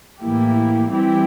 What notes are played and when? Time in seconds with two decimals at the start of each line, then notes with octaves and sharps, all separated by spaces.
0.21 A2 E3 A#3 E4 G4
0.88 E3 G3 C4 E4 G4